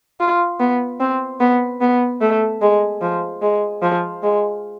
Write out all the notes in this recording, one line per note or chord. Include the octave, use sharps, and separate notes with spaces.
F4
B3
C4
B3
B3
A3
G#3
F3
G#3
F3
G#3